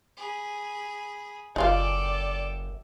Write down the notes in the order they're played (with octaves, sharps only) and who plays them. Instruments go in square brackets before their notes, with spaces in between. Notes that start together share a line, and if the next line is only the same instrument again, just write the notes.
[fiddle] G#4 B5
[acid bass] F#1 [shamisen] D#4 F4 F5 [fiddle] A4 G5 [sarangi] D5